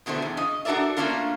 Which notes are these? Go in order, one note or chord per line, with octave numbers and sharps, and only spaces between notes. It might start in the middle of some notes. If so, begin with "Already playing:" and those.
E2 B2 D3 A3 C5
E2
C#3 D#5
D4 F#4 A4 A#4 D5 E5
A3 A#3 C#4 D4 F4 A#4